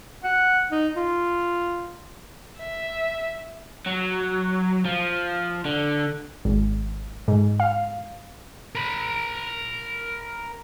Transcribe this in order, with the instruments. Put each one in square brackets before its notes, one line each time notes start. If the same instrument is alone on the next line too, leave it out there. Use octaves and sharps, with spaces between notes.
[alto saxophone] F#5
D#4
F4
[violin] E5
[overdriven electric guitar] F#3
F3
D3
[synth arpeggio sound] G#1
G#2
F5
[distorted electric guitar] A#4 B5